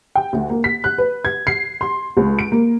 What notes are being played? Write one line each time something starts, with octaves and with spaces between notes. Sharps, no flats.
G5
D2
A#3
B6
F#6
B4
G#6
C7
C6
C#2
D7
A#3